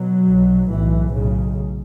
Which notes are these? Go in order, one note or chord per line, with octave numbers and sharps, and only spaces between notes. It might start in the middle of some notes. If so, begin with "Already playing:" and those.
Already playing: B2 F#3
B1 B2
B1 A2 E3
B1 A2 C#3